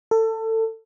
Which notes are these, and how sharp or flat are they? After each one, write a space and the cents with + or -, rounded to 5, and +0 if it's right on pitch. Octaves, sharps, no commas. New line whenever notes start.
A4 +25